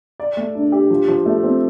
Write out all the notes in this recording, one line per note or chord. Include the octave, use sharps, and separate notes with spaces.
D5
A3
D4
G4
F3
F3
A3
C4